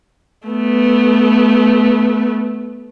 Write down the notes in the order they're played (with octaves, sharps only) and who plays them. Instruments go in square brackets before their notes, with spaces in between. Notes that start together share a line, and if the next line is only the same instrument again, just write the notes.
[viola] A3 B3